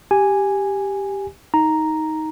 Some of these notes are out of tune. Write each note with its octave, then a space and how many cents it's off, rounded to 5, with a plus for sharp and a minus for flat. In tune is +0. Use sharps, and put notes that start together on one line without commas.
G4 +0 G#5 -5
D#4 +15 A#5 +0